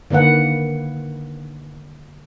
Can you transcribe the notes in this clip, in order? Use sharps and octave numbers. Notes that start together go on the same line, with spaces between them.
D3 D#3 A#3 B4 F#5